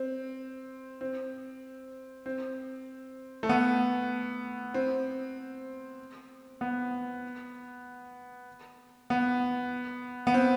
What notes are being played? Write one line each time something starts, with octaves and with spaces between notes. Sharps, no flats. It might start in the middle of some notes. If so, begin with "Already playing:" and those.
Already playing: C4
C4
C4
A3
B3
C4
B3
B3
B3
C4